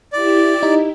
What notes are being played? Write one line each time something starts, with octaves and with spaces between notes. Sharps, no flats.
E4 G4 D5
D#4